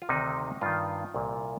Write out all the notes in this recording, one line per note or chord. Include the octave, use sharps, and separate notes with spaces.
F4
D2 C3 D#3 D#4
G2 D#3 F4
C2 A#2